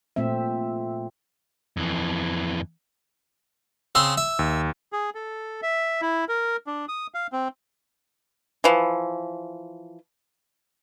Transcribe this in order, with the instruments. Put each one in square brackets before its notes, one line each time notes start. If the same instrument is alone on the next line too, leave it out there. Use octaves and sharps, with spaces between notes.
[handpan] A#2 A3 C4 E5
[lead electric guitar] F2 E3
[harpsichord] C#3 C4 C6 [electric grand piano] E6
[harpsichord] E5
[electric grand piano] D#2
[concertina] G#4
A4
E5
E4
A#4
D4
D#6
F5
C4
[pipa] E3 F3